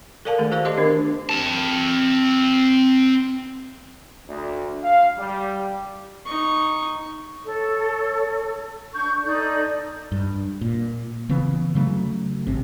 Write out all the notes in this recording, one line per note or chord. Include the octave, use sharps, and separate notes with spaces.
A4 A#4 D5 F5 G#5 A5
D#3 A3 G#4
F#4 A4 C5 D5 F5
G4 C5 D#5 A5 C6 D6
D#3 B3 D4 A#4
C4 A5
D2
F5
G3
D#4 C#6
A4 C#5
D4 C#6 G6
D#4 A4 D5 G6
G2
A#2
C#3 E3 B3
C#3 F#3 A3
G#1 C3